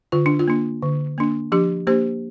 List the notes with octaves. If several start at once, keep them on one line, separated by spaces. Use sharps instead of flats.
D3 F4
D4
F4
A#3 D4
D3
A#3 D4
F3 D4 G4
A#3 D4 G4 C5